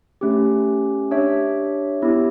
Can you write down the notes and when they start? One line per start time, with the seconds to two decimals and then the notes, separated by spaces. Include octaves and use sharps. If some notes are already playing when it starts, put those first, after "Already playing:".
0.21 A3 C#4 G4
1.11 D4 G4 C#5 E5
2.02 B3 E4 G4